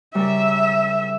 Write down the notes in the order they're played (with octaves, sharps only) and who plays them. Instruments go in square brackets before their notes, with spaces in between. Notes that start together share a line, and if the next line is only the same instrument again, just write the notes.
[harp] C#3 G3 A#4 [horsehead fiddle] E5